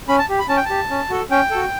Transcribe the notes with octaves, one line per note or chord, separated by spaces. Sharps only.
C#4 B5
A5
G4
B5
C#4 A5
G5
G4 A5
C#4
F#4 A4
C#4 G5
F#4 A4